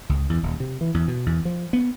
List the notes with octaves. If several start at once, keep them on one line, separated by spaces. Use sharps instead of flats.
C#2
E2
D#1
C3
E3
E2
B2
E2
F3
B3